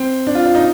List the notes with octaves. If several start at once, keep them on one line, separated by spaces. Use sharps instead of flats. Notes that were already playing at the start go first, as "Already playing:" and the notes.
Already playing: C4
D4
F4
F4
D#4